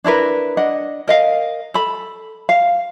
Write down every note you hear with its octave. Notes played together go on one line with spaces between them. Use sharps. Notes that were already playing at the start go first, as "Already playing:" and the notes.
D4 E4 A#4 B4
D4 D#5 F#5
A#4 D#5 F5
A4 B5
F5